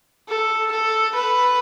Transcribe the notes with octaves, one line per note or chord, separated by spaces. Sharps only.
A4
A4
B4